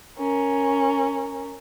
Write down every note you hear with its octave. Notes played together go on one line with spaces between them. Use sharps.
C#4 A#4